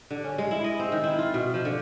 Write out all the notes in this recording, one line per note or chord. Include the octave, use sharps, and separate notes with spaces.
D3
C#4
G#3
E4
D#5
C4
D#3
E4
F4
B2
F3
D3